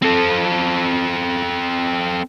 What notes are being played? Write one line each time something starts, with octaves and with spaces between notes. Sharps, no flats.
C4 A4